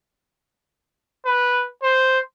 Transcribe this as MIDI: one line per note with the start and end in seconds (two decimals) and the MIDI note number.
1.25 1.66 71
1.82 2.19 72